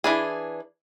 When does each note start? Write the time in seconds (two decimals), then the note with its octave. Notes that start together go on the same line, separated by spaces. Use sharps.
0.04 E3 D4 G#4